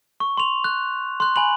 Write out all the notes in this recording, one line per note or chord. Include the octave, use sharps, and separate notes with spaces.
C#6
C6 F7
F#6
C6 F#6
G#5 B5 F#7